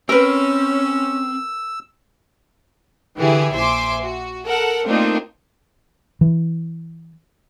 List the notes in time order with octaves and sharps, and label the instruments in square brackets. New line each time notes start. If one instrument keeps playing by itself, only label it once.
[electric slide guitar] C4 [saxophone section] C#4 [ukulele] A#4 B4 [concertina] E6
[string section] D3 E3 E4 G4 G#4
A#1 C5 E5 G#5 C6 D6
F#4
A4 A#4 F#5
A3 A#3 C4 D4 D#4 F4
[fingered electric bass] E3